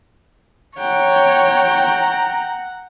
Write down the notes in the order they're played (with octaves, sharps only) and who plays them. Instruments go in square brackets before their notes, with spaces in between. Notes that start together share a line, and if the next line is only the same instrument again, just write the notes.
[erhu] C#5 [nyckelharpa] F#5 [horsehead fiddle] G5 [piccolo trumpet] A#5